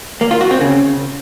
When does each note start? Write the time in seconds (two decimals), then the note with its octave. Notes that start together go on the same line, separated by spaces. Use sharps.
0.21 A#3
0.31 F4
0.41 F#4
0.51 C4
0.61 C#3